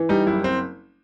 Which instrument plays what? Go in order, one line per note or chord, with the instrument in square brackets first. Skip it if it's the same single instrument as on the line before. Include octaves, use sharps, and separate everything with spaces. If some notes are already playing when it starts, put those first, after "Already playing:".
Already playing: [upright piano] E3
[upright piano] G3 [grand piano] D#4
[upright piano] F#1 [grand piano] E4
[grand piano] C4